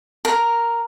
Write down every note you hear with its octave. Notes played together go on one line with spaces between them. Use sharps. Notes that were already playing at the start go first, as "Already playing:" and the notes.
A#4